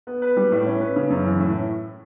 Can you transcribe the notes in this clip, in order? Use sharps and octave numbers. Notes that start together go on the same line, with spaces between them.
B3
B4
G3
A2
C#4
B4
C#3
F#2
E3
A2